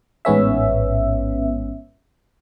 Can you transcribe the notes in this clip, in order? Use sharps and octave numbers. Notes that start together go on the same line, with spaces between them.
A1 G#2 B3 C#4 E5